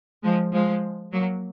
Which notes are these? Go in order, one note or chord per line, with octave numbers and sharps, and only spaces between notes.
F3 G#3
F3 G#3
F#3 A#3